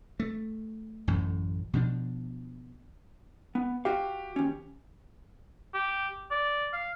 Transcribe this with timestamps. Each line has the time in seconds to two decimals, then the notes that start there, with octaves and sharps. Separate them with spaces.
0.20 A3
1.07 A1 F#2 A2
1.73 B2 F3 D4
3.55 B3
3.85 F#4 G4 F5
4.36 D#2 C#4
5.74 G4
6.31 D5
6.73 F5